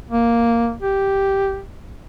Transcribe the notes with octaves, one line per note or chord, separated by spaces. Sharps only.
A#3
G4